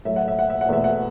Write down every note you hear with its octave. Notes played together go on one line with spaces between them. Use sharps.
A2 F#3 A3 E5
F#5
E5
F#5
E5
F#5
E2 B2 A3 E5
F#5